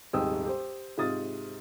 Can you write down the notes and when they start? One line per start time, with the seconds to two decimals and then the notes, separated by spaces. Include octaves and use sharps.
0.13 D#1 G#2 C3 G5 D#6 E6
0.47 G4 C5
0.97 G#2 C3 F4 D#6 A6